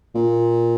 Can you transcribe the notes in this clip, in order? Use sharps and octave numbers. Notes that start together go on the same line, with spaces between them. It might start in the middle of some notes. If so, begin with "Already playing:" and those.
A#2